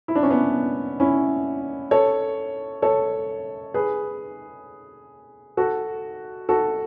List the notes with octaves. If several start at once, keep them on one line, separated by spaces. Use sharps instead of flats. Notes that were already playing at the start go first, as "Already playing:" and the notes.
E4
D4
C#4
B3 D4
C#4 E4
A4 C#5
A4 C#5
G#4 B4
F#4 A4
F#4 A4